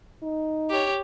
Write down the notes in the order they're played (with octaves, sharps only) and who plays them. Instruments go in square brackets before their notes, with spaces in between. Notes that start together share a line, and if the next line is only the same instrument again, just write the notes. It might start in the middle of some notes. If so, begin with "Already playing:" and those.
[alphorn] D#4
[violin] G4 C#5